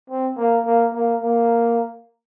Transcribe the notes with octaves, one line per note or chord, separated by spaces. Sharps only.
C4
A#3
A#3
A#3
A#3